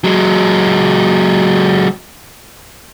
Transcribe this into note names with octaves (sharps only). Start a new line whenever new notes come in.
F#3 G#3